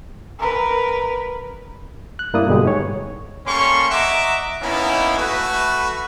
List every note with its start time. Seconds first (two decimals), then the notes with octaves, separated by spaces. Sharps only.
0.39 A#4 B4
2.19 F#6
2.34 G2 A#3 E4 D5 D#6
2.47 G2 B2 D3 G#3 G4
2.65 G#2 C#5
3.46 G3 A#3 C#4 A4 C6 C#6
3.91 D#5 E5 F#5 A#5 D6
4.61 A#3 B3 C#4 D#4 E4
5.19 A3 F#4 A4 B4